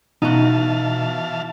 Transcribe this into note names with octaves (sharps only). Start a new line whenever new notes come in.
B2 E3 D#4 F#4 F5 A5